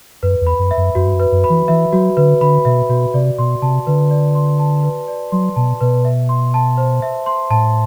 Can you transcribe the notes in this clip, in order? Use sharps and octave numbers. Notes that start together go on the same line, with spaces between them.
F#2 B4
E2
B5
F#2
E5
F#2
F#2 F#4
G2
F#2
B4
F#2
B5
E3
E3 E5
F#3 F#4
D3 B4
D3 B5
B2 E5
B2 F#4
C3 D5
B2 C6
C3 A5
D3 B4
D5
C6
A5
B4
D5
F#3 C6
B2 A5
B2 B4
E5
C6
A5
C5
E5
C6
A2 A5